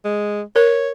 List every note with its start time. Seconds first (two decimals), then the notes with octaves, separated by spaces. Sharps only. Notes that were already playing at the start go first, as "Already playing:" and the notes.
0.05 G#3
0.56 A#4 C#5